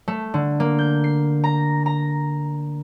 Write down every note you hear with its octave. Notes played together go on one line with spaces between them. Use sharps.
A3
D3
A#3
G6
C7
A#5
A#5